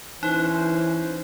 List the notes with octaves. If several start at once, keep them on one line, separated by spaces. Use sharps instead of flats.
E3 C#4 D#4 C5